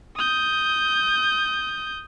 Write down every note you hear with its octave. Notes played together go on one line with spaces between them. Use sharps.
D#6 G6